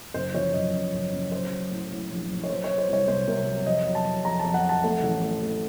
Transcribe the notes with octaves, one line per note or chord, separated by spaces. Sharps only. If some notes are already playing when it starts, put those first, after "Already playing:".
F#1 C5
F3 C#5
F#2 D#5
F#2
F#1
F#1
F#3 C5
F#3
A2
A2
A#1
A#1
C#5
F#3 C5
C#5
F#3
C5
C2 C#5
C3 C5
C3 A#4
F#3
F2 D#5
F#3
A5
F#3
F2 A#5
A5
F2
F#5
F2
A5
A3 F#5
A1
A3
A3